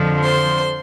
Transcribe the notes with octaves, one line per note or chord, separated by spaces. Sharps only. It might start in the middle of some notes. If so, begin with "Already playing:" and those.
Already playing: F2 D3 F3
C5 C6